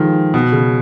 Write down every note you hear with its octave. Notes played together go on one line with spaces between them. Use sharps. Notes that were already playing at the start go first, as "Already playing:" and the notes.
Already playing: D#3 F3 G#3
B2
C#3